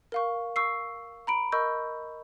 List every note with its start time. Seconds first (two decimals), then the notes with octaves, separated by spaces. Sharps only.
0.12 A#4 F5 C#6
0.56 C#6 E6 C7
1.27 A#5 B5 D7
1.52 A#4 D#5 B5 C#6 E6 G6